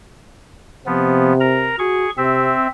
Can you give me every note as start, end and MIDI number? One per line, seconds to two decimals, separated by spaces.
0.86 1.74 48
0.86 1.33 53
0.86 1.33 59
1.40 1.76 70
1.40 1.76 82
1.79 2.06 66
1.79 2.10 68
1.79 2.10 85
2.17 2.53 48
2.17 2.67 60
2.17 2.67 76